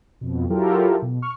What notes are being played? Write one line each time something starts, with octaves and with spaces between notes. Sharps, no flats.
F2 B2
F#3 E4 F4 G4 A4 A#4
B2
C#6 F6